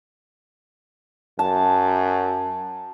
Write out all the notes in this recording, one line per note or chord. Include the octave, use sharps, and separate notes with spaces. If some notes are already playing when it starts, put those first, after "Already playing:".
F#2 A5